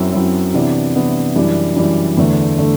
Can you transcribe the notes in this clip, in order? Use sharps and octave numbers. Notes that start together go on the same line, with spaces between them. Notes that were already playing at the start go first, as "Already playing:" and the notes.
Already playing: F#2 F#3 C4 E4
F#2 F#3 C4 E4
C3 E3 B3 D4
C3 E3 B3 D4
F#2 E3 G3 D4
F#2 E3 G3 D4
E2 D3 A3
D3 A3